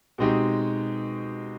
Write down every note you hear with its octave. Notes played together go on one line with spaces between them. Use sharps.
B2 G#3 C4 D#4 G4